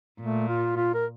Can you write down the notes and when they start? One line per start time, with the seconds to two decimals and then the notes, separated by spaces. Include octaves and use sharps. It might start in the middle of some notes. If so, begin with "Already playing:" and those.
0.21 A#2 A3
0.48 F4
0.77 F4
0.94 A#4